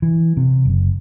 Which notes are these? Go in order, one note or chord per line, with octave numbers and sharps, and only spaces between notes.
E3
C3
F#1